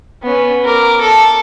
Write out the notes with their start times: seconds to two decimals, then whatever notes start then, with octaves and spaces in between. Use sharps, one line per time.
0.23 B3 C#4
0.65 A#4 D6
1.01 A4 A5